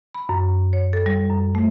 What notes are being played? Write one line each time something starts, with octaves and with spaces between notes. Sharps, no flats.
B5
F#2
C#5
A4
G3
F#2
A3